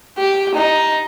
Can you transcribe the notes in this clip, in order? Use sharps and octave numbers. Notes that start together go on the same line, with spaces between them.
G4
D#4